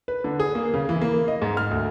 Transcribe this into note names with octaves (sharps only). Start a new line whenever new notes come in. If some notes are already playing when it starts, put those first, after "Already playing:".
B4
D3
G#4
A#3
C#3
E3
A#3
D#5
G#2
F6
D2